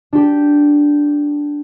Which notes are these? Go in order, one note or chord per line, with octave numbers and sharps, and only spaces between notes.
D4 G4